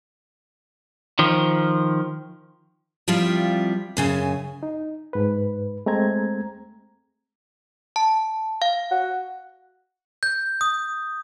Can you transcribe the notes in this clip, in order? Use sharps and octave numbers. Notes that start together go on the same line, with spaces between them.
D#3 F3
F3 G3 C4 E4 F4
F#2 C#3 G#5
D#4
G#2 B4
G#3 A3 C4 A#5 G#6
A5
F5
F#4
G6
D#6